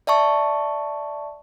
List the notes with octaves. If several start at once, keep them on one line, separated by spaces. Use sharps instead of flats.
D5 E5 A5 C#6